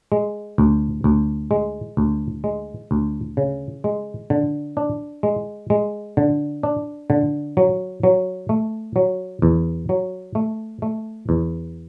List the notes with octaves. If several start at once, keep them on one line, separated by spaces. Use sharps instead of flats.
G#3
D2
D2
G#3
D2
G#3
D2
C#3
G#3
D3
D4
G#3
G#3
D3
D4
D3
F#3
F#3
A3
F#3
E2
F#3
A3
A3
E2